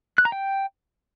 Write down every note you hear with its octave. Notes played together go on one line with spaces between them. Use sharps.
F#6
A#5
G5